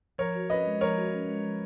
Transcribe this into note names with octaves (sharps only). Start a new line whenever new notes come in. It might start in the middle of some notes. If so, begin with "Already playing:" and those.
F3 A#4 C#5
F#4
C#4 B4 D#5
G#3
F3 A#4 C#5
F#4
C#4
G#3
F3